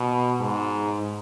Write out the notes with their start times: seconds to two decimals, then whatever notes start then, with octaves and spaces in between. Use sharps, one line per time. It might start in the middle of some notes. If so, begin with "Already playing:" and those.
Already playing: B2
0.40 G#2